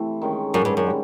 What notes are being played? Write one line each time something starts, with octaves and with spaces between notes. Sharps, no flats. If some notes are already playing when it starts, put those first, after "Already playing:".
Already playing: C3 E3 A3
D#3 G#3 C#4
F#2
G2
F#2
D3 G3